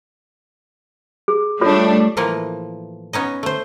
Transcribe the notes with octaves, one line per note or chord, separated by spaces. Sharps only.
G#4
G3 A3 D4 F4 A4 C#5
A2 E3 F3 A#3
B3 C#4 D#4 D#5
A3 C5